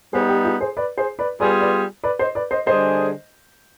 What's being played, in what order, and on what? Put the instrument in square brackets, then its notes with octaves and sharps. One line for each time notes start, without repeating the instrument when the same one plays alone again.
[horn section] G3 B3 D#4 [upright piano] G#4 C5
[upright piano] G4 B4
F4 G#4
G#4 C5
B4 D5
G#4 C5
B4 D5
[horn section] G3 B3 F4 G#4 [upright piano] B4 D5
[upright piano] B4 D5
B4 D5
C5 D#5
B4 D5
C5 D#5
[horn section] D3 G3 D4 G#4 [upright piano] C5 D#5